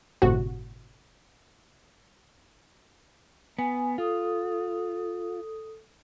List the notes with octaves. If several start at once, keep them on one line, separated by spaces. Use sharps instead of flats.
G1 A2 C3 F#4
B3 G#5
F4 A4 D#6